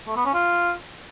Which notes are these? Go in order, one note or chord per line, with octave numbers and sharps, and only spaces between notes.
A3
B3
C#4
F4